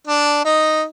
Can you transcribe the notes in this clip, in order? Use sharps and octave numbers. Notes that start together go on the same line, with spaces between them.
D4 D5
D#4 D#5